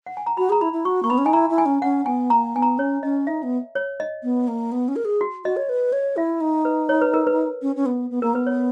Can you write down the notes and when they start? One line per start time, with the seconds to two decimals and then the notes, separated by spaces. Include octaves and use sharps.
0.06 F#5
0.17 G#5
0.26 A#5
0.37 F#4 B5
0.50 G#4 A#5
0.61 E4 B5
0.73 E4
0.85 F#4 C#6
1.03 A#3 C#6
1.10 B3 B5
1.18 C#4
1.25 D#4 G#5
1.33 E4 A#5
1.50 E4
1.58 G#5
1.66 C#4
1.82 C#4 F#5
2.06 B3 G#5
2.30 A#3 A#5
2.55 B3 G#5
2.62 A#5
2.78 C#4 C#5
3.03 C#4 D#5
3.27 D#4 E5
3.43 B3
3.75 C#5
4.00 D#5
4.23 B3
4.48 A#3
4.72 B3
4.88 C#4
4.96 A#4
5.05 G#4
5.21 F#4
5.44 F#4 D#5
5.57 C#5
5.69 B4
5.93 C#5
6.17 E4 E5
6.41 D#4
6.65 B4
6.89 C#5
7.02 B4
7.14 A#4
7.27 B4
7.62 C#4
7.76 C#4
7.86 B3
8.10 B3
8.22 A#3 A#4
8.33 B3 B4
8.47 C#5